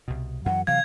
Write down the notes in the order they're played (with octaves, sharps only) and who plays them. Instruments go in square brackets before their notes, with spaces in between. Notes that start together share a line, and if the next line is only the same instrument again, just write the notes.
[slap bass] C2 B2
[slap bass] F#2 E3 F#3 [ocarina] F#5
[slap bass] C3 E3 F#3 [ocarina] F5 [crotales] G#6